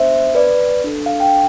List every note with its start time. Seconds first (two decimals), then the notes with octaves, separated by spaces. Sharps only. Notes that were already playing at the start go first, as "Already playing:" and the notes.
Already playing: B3 D4 C5 E5
0.35 B4 D5
0.84 D4 A4
1.06 F5
1.20 G5